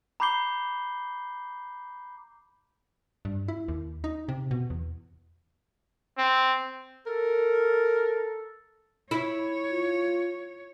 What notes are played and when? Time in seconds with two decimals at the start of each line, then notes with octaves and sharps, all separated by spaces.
0.20 A#5 B5 D6 G6 C7 G7
3.25 G2
3.48 E4
3.68 D#2
4.04 D#4
4.29 C3
4.51 B2
4.70 E2
6.18 C4
7.06 A4 A#4
9.11 E4 C#5
9.71 F4